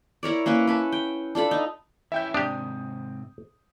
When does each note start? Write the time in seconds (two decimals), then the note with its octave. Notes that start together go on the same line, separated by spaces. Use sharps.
0.23 E4 A#4 C#5 D5
0.46 A#3 C#4 E4 B4
0.67 C#4 B4 A5
0.92 G5
1.35 D4 F4 A4 B5
1.51 D#4
2.12 E3 C#4 E4 E5 G5 G6
2.34 G#2 C3 C4 D4 G4 D#6